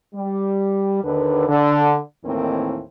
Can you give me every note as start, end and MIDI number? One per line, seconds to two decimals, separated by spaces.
0.14 1.01 55
1.03 1.48 39
1.03 1.48 50
1.03 1.48 71
1.48 1.97 50
2.24 2.82 39
2.24 2.82 45
2.24 2.82 51
2.24 2.82 52
2.24 2.82 58
2.24 2.82 60